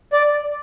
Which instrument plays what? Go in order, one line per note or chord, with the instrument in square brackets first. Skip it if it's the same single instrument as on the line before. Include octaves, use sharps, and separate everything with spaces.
[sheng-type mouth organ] D5